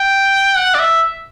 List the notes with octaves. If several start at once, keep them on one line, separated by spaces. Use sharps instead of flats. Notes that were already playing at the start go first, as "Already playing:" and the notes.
Already playing: G5
F#5
D5
E5